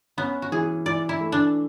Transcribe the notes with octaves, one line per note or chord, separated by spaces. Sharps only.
B3 C#4
F#4
E3 G#4
E3 D5
E4
A3
D4